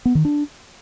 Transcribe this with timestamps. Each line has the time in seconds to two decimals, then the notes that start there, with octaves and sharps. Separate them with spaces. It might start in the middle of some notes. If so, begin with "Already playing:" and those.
0.05 B3
0.15 D#3
0.25 D4